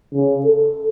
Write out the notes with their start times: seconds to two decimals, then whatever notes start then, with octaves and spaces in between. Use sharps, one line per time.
0.14 C#3
0.46 A4